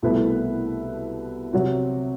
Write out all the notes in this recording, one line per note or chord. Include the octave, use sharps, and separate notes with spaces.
C2 B2 A3 E4 B4
C3 F#3 C4 F#4